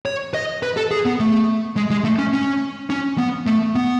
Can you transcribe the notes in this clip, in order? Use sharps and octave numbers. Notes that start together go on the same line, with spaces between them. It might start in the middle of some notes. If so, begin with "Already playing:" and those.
C#5
D#5
B4
A4
G#4
B3
A3
G#3
G#3
A3
C#4
C#4
C#4
B3
A3
B3